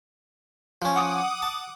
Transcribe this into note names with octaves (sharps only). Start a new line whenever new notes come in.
F3 C#4
F#5 D6 D#6
A5